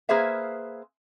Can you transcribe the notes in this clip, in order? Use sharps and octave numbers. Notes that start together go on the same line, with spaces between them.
A#3 G#4 B4 C5 E5 F5